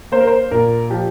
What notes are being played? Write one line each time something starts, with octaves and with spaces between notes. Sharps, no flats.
A#3 C5
A#4
C5
A#2 A#4
F3 G4